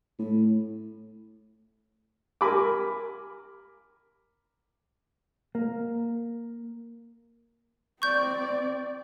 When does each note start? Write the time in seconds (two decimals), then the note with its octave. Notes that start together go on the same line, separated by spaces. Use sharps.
0.19 A2
2.41 A#4 G#5 B5 D6
5.55 A#3
8.02 C4 D5 C#6 G6